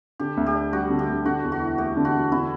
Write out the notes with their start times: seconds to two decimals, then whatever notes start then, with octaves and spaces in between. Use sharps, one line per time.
0.20 D3 G4
0.37 D2
0.46 G4
0.55 D4
0.73 G3 F#4
0.90 D3
0.99 G4
1.09 D2
1.26 D3 F#4
1.43 E2
1.52 F#4
1.61 E4
1.78 A3 G4
1.97 D3
2.05 F#4
2.13 E2
2.32 D3 E4